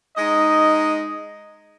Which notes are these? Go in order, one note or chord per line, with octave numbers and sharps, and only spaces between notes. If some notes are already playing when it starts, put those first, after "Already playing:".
G#3 D#4 D#5